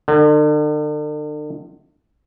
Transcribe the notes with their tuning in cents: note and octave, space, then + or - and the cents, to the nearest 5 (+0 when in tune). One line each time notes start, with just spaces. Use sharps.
D3 +40